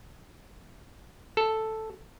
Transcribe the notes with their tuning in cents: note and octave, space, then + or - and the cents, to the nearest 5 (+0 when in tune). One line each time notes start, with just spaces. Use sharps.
A4 +0